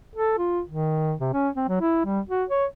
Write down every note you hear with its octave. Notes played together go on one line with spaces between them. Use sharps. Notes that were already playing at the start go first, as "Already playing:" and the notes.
A4
F4
D#3
C3
C#4
C4
F#3
E4
G3
F#4
C#5